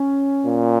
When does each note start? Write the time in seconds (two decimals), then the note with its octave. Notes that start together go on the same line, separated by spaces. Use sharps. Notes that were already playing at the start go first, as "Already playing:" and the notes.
Already playing: C#4
0.45 A#2